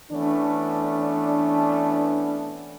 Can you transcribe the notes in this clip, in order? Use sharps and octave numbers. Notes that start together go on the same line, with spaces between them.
E3 A3 B3 C#4 D4